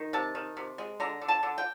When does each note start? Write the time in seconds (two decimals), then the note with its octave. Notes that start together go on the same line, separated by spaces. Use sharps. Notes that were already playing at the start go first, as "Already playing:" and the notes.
Already playing: D#3
0.13 C3 A5
0.35 D#3
0.57 C3
0.78 G#3
1.00 D3 A#5
1.21 D3
1.28 A5
1.43 D3
1.58 G5